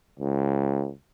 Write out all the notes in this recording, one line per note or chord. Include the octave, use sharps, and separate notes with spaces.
C#2